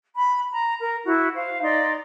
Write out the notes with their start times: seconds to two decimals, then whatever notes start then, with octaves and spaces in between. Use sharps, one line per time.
0.13 B5
0.50 A#5
0.79 A#4
1.04 E4 F#4 E5
1.34 C5 F5
1.62 D#4 D5 C6